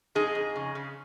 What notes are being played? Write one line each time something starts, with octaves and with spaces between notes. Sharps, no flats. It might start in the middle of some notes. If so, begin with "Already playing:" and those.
F2 D#4 G#4
F2
C#3
C#3